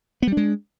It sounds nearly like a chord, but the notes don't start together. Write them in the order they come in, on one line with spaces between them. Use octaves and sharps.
B3 G3 D4 G#3